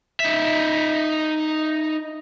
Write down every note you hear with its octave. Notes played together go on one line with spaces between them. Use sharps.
D#4 E5